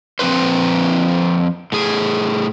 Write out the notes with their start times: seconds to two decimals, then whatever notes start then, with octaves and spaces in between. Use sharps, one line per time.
0.19 F3 C4 C#4 B4 C5
1.72 A2 G#4